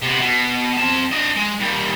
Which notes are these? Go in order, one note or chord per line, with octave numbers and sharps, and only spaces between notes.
C3 B3
B2
C4 A5
D4 D#5
G#3
A#2 G3